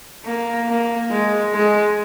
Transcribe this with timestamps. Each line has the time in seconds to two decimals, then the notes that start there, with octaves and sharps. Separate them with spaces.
0.25 A#3
0.68 A#3
1.10 G#3
1.54 G#3